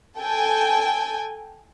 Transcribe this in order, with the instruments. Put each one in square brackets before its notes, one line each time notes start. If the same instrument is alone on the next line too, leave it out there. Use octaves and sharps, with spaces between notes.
[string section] A4 G5 G#5